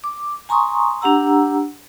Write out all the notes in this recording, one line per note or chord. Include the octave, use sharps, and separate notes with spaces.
D6
G#5 A#5 C6 C#6 D#6
D4 G4 F#5 A#5 E6